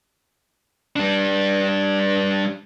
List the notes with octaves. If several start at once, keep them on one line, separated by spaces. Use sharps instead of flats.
G3 D4